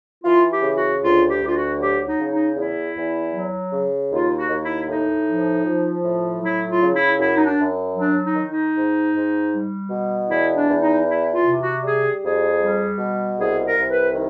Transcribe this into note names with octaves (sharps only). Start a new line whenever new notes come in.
E3 F4
G4
C#3
F#4
D2 F4
G4
D2
F4
F#4
F#3 G4
D#4
C#3
D#4
E2 E4
E2
F#3
C#3
D#2 F4
F#4
D#2
E4
A2 D#4
F3
F3
A2
F#3 E4
F4
C#3
E4
F#2 E4
D#4
D4
F#2
F#3 D4
D#4
D#3
D#4
G#2
G#2
G3
B2
E2 E4
D4
E2
D#4
E3 E4
F4
C3
F#4
G3 G#4
F2 G#4
G3
B2
C2 G#4
A#4
C2
B4
D#3